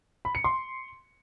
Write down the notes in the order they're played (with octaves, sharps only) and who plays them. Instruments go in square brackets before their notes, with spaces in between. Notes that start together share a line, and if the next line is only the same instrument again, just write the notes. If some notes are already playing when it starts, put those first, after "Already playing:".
[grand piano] B5
C#7
C6